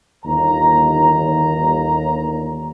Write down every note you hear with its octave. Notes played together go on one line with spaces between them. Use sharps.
G1 D#2 A#5